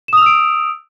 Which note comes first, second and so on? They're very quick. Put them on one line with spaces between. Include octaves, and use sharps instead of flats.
E7 D#6 F7 E6 D7